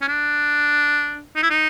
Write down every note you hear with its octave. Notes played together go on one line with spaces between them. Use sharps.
C#4
D4
D#4
E4
D#4